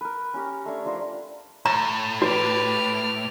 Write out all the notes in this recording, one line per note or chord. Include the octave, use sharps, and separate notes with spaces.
A#4 B4
C#4 G4 A#4
A3 D4 C#5
F3 D4 A#4 C5
A2 A#5
F#4 G4 B4 D5 F6